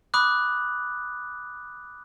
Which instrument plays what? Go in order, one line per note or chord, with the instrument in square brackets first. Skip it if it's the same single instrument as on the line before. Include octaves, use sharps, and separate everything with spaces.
[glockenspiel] B5 D6 D#6 F#6